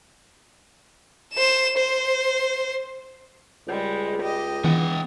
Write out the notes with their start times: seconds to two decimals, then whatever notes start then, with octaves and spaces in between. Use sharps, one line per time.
1.34 C5 E7
1.77 C5
3.67 C#2 G3 G#3
4.21 G4 D#5
4.64 E3 B3 F#5 G5